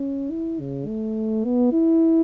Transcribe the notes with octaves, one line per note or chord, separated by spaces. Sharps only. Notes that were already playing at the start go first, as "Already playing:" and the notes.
Already playing: C#4
E4
C#3
A3
B3
E4